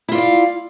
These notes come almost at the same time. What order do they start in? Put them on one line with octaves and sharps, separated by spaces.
E4 F4 D5 F5